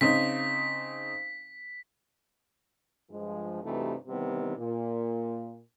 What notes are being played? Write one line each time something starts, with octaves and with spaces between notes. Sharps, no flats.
C#3 C4 D#4 B6
G2 F3 G#3
G2 C3 E3 A3 D#4 F#4
C3 D#3 E3 G3 B3
A#2